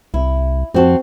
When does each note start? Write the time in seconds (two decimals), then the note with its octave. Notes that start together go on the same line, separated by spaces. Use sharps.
0.14 C2 E4
0.74 F2 C4 F#4 A5